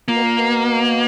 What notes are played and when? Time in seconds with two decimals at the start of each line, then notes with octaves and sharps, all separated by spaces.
0.08 A#2 A#3
0.16 B2
0.23 A#2
0.38 B2